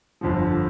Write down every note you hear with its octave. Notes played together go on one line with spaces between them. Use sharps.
G1 F2 D3 F3